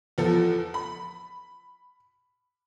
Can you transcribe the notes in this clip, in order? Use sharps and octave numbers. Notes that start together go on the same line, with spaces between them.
E2 F3 A4
B5